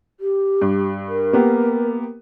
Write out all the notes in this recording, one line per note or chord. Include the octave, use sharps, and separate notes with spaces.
G4
G2
A#4
A#3 B3 G4